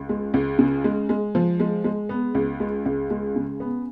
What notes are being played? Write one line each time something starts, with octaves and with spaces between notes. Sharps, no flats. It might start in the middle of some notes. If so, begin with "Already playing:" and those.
Already playing: C#2
G#3
C#2
C#3
G#3
G#3
F3
G#3
G#3
B3
C#2
G#3
C#2
G#3
C#3
B3